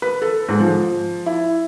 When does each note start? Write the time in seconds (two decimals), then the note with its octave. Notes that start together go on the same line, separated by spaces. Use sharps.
0.02 B4
0.22 A4
0.48 G#2
0.60 F3
1.26 E4